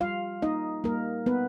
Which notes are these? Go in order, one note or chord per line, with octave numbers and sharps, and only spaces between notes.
G3 F4 F5
A#3 D#4 D#5
G3 A#3 A#4
A#3 B3 B4